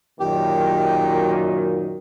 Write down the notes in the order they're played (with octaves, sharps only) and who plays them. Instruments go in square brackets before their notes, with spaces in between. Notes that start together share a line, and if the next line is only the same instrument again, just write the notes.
[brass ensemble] F#2 A#2 D#3 [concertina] G4